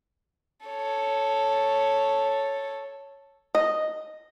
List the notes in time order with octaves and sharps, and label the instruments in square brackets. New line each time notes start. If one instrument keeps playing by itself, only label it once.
[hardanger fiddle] A4 C#5
[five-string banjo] D#5